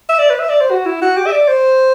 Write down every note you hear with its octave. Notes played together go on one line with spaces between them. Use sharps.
E5
D5
B4
E5
D5
C5
F#4
E4
F#4
G4
E5
D5
C5